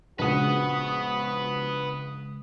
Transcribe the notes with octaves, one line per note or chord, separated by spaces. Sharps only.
A#1 C#3 G#3 F#4 B4 F#5 D#6